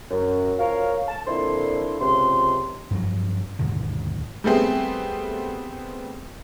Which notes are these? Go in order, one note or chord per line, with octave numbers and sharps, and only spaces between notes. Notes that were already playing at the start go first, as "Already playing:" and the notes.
F#2
F3 A#4 C#5 F5
A5
F2 A#2 D3 E4 C6
C#2 C3 C6
G2 F3 F#3
D#2 G#2 B2 D3
G3 A3 B3 C4 G#4